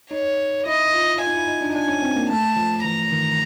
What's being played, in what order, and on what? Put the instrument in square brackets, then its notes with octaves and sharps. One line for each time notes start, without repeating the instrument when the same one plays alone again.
[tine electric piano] D#4 [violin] C#5
[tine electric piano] E4 [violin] D#5
[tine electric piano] F4
[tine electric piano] F4 [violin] G#5
[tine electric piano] D#4
E4
D#4
D4
D#4
[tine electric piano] D4 [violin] G#5
[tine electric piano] C#4
C4
A#3
[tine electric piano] A3 [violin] A5
[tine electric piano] F3
[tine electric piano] E3 [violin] A#5
[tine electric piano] D#3